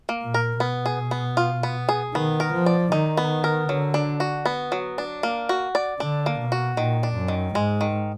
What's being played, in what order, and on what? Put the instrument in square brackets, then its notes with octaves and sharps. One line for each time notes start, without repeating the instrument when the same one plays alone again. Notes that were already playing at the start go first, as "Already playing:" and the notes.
[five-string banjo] A#3
[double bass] A#2
[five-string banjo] A#4
[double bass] B2 [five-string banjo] B3
[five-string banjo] G#4
B3
F4
B3
G#4
[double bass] D#3 [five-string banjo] B3
[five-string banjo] A#4
[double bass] F3
[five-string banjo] D5
[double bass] D#3 [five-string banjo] D#4
[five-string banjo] B3
A#4
[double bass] D3 [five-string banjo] F#3
[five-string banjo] D4
F#4
B3
F#3
D4
A#3
F#4
D5
[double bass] D3 [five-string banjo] D4
[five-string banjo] A#3
[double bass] B2
[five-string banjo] F#4
[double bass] A#2 [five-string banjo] D#3
[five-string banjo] D4
[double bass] F#2
[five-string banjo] D#3
[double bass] G#2 [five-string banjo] G#3
[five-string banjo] D#3